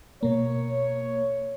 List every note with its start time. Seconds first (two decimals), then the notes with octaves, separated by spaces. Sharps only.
0.23 B2 A#3 C#5